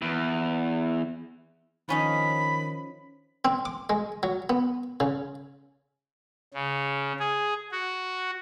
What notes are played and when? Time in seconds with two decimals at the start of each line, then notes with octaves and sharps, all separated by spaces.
0.02 E2
1.89 D#3 F3 C#4 D#4 B5
3.45 C4
3.65 D6
3.90 G#3
4.23 F#3
4.49 B3
5.00 C#3
6.54 C#3
7.20 G#4
7.72 F#4